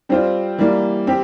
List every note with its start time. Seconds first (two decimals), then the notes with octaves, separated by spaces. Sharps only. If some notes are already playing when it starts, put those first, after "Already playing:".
0.09 G3 C4 F4 C5
0.58 E3 G3 A#3
1.07 C4 G4